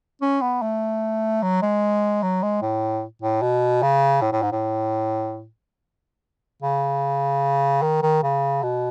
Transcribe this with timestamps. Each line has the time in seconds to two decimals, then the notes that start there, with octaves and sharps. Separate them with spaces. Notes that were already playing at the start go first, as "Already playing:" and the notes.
0.22 C#4
0.42 B3
0.62 A3
1.43 F#3
1.62 G#3
2.23 F#3
2.43 G#3
2.62 A2
3.22 A2
3.42 B2
3.82 C#3
4.22 A2
4.32 A2
4.42 G#2
4.52 A2
6.62 C#3
7.82 D#3
8.02 D#3
8.23 C#3
8.63 B2